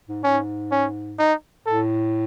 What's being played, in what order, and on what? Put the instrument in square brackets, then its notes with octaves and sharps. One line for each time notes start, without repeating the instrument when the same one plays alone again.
[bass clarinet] G#2
[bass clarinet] G#2 [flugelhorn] C#4
[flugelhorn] C#4
D#4
[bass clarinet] A2 [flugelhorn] A4